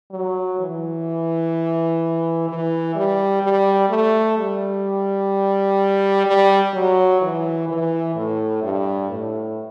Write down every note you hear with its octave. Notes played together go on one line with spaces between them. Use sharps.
F#3
E3
E3
G3
G3
A3
G3
G3
F#3
E3
E3
A2
G2
A2